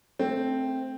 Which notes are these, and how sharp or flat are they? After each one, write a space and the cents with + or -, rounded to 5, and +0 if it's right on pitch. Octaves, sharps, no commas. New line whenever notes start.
A3 +0 C4 +0